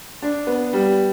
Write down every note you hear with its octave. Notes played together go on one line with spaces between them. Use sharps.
D4
B3
G3